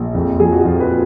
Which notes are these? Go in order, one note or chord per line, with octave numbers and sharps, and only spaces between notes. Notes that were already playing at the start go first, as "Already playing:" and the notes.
Already playing: A#1
F2
F3 G#4
F#4
F2 F4
B4